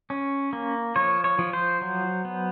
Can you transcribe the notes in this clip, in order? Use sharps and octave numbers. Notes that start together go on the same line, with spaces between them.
C#4
A#3
F3 C#5
C#5
F3
C5
F#3
B3